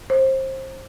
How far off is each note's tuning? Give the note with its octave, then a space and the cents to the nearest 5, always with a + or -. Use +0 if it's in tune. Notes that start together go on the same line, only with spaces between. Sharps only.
C5 +25